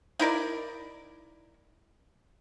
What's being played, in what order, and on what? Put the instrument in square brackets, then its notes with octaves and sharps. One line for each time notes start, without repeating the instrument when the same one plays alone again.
[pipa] D#4 E4 A#4 D5